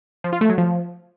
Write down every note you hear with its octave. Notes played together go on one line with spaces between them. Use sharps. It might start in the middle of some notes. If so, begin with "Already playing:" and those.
F3
F4
A3
F#3
F3